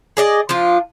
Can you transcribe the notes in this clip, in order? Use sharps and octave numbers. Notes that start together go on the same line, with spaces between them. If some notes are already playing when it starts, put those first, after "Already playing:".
G#4 D5 D#5
F3 D4 F4